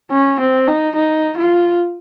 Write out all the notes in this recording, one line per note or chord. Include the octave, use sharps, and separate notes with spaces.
C#4
C4
D#4
D#4
F4